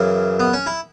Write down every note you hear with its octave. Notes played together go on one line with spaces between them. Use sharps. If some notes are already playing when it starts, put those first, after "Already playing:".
Already playing: F#2 C#3 E3
B3
C#4
E4